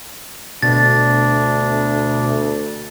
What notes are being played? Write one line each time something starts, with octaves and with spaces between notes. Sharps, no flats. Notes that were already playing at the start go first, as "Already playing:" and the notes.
D2 B2 D4 A6